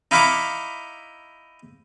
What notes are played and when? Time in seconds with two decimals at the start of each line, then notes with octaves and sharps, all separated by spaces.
0.11 D#4 E4 F5 B5 C#6 D6